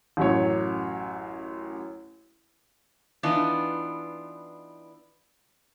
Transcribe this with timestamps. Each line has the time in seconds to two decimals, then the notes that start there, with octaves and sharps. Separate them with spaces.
0.17 A1 F#2 C#5
3.23 E3 B3 D4 D#4 F4